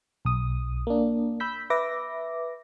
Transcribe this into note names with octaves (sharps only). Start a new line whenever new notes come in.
B1 D#6
A#3 D4
B5 E6 G6 B6
B4 E5 D6 A#6